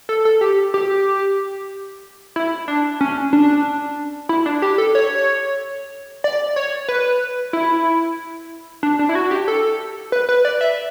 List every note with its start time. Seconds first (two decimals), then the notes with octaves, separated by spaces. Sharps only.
0.09 A4
0.25 A4
0.41 G4
0.74 G4
2.36 E4
2.68 D4
3.01 C#4
3.33 D4
4.29 E4
4.46 D4
4.62 G4
4.78 A4
4.95 C#5
6.24 D5
6.56 C#5
6.89 B4
7.53 E4
8.83 D4
8.99 D4
9.09 E4
9.15 F#4
9.31 G4
9.48 A4
10.12 B4
10.29 B4
10.45 D5
10.61 E5